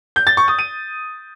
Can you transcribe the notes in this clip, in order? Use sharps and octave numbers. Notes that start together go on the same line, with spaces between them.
G6
A6
C#6
D#6
D#7